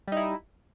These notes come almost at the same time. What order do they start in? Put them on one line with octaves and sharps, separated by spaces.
G3 D#4 E4